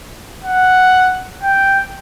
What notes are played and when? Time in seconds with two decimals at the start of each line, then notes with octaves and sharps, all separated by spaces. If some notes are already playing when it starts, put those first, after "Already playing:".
0.43 F#5
1.43 G5